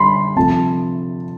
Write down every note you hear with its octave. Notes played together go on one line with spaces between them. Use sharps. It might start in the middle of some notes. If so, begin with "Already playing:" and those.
Already playing: D3 G3 B5 C6
C3 F3 A3 A5